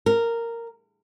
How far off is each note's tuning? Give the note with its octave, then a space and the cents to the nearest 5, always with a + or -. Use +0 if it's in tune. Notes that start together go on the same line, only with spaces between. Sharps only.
A#4 -10